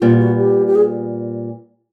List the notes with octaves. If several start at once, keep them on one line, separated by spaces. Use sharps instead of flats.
A#2 G3 B3 F4
F#4
G4
G4
G#4